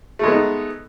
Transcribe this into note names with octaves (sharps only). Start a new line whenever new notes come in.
G#3 A3 B3 D#4